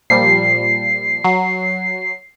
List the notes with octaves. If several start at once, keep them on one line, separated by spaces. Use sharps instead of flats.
A#2 F3 G3 C7
F#3